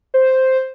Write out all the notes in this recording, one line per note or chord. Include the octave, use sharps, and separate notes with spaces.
C5